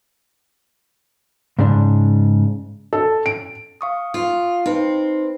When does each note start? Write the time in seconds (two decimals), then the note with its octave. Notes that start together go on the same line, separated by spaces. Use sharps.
1.59 G#2 C#3 D4
2.93 A4
3.26 D7
3.81 F5 C#6 D#6
4.14 F4
4.66 C4 D#4 B4